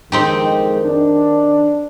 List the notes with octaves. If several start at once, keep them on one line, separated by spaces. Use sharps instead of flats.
F2 D#3 G#3 C4 D#4 G4
D4